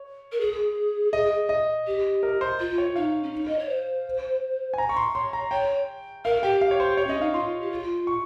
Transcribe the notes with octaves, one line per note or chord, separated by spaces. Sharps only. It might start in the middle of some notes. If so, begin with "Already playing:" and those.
Already playing: C#5
A#4
G#4
D#5
D#5
G4
A#4
C5
F4
C#5
D#4 F5
C#4
D#4
D#5
C#5
C5
G#5
A#5
C#6
C6
C#5 C6
A#5
C#5 G5
A#4 F5
G4 G5
F5
C#5
C5
C#5
C#4 D#5
D#4 F5
F4 C6
G4
F4
C#6